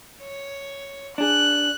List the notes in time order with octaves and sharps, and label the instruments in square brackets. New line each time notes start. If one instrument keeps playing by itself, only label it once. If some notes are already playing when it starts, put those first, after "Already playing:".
[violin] C#5
[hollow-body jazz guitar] D4 G#4 [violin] F#6